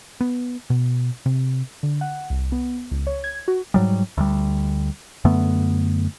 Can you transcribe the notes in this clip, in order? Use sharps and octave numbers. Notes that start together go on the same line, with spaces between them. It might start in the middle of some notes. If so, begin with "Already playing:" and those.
B3
B2
C3
D3
F#5
C2
B3
C#2
C#5
G#6
F#4
G#2 F#3 G3
D2 G3
F#2 D3 A3 B3